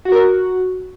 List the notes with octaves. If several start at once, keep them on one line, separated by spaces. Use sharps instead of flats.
F#4
A#4
F#4